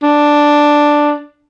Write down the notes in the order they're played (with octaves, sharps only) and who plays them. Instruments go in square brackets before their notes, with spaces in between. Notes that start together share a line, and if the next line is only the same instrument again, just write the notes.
[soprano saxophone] D4